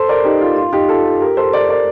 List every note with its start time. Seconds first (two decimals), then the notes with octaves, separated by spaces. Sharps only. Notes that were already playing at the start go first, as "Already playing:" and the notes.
Already playing: A4 C5
0.09 A#4 D5
0.24 D#4 G4
0.41 F4
0.57 F4
0.73 D#4 G4
0.89 F4 A4
1.21 G4 A#4
1.37 A4 C5
1.53 A#4 D5
1.69 A#4 D5